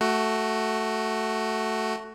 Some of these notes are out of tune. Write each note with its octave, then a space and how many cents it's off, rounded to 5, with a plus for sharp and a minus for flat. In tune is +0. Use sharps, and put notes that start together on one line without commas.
A3 +0 F#4 +10